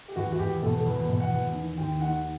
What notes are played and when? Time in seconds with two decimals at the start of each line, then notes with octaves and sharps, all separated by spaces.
0.08 G4
0.16 E2 F#4
0.33 F#4
0.39 E2 G4
0.62 B2 A4
0.78 A4
0.86 E2 B4
1.08 B2
1.20 F#5
1.32 E2
1.55 D#3
1.77 D#2 G5
2.00 D#3 F#5